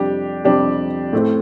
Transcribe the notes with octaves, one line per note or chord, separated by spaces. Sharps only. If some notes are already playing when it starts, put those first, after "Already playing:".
Already playing: F2 C3 G3 C4 D4 G4
F2 C3 G3 C4 D4 G4
A2 A3 C4